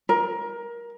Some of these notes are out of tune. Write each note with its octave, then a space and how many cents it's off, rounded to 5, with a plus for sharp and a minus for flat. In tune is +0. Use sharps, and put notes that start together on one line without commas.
A#4 +20